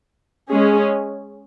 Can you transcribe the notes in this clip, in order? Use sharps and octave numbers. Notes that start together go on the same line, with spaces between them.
G#3 C#4 G#4